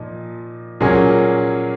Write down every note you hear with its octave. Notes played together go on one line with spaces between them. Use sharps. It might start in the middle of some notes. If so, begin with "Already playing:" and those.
Already playing: A#2 F3 D#4
A#2 F#3 A#3 C#4 G#4